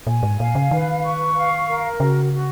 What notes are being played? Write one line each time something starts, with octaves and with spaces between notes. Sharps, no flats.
A#2 G#5
G#2
A#2 F5
C#3
D#3 B4
C#6
F5
A#4
C#3 F#4
F#4